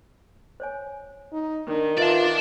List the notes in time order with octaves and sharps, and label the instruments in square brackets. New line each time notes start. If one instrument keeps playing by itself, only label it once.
[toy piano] C5 C#5 G#5
[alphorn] D#4
[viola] D#3 [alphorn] D4 [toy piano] A#4
[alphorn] F4 [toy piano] B4 C5 E5 [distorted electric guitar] D5 A5